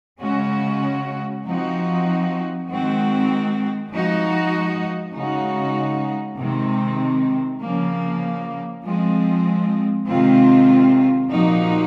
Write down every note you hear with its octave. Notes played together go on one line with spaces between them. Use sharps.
C#3 G#3 C#4 F#4
F3 C4 D#4 F#4
D#3 G#3 C4 F#4
F3 G#3 D#4 F#4
C#3 G#3 D#4 F#4
C3 D#3 G#3 C4
C#3 F3 A#3
F3 G#3 C4
C3 D#3 G#3 C4 F4
A#2 F3 A#3 D#4 F#4